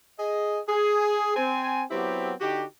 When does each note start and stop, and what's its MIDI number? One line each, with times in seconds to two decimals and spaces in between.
0.19 0.61 68
0.19 0.61 75
0.69 1.36 68
1.37 1.83 60
1.37 1.83 80
1.90 2.32 54
1.90 2.32 59
1.90 2.32 60
1.90 2.32 64
1.90 2.32 67
2.41 2.64 50
2.41 2.64 63
2.41 2.64 66
2.41 2.64 67